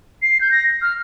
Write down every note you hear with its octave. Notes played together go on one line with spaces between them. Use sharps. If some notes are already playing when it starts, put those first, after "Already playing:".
C7
G6
A#6
F6